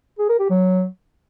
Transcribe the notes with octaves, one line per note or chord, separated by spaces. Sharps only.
G#4
A#4
G4
F#3